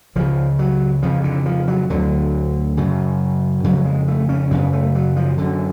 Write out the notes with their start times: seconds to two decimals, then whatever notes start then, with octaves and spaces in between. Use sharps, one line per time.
0.16 C#2 C#3 F3
0.59 F#3
1.03 F2 C#3 F3
1.24 D3
1.46 F3
1.68 F#3
1.90 D2 D3 F#3
2.77 F#2 C#3
3.64 F2 C#3 F#3
3.85 G#3
4.08 A3
4.29 C#4
4.51 F#2 C#3 B3
4.73 A3
4.95 F#3
5.16 F3
5.38 F#2 D3